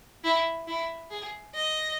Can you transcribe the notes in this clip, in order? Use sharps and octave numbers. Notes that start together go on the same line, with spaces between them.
E4
E4
G#4
D#5